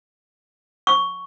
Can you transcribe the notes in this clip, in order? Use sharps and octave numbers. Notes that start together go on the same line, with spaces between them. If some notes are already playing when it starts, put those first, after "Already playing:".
C#6